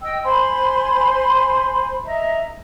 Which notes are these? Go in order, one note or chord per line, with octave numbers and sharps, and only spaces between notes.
D#5 G5 E6
C5 G#5 B5 C6
D#5 E5 A#5